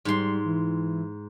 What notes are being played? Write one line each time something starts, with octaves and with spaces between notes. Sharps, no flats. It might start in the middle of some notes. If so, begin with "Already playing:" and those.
G#2 G3 C6
E3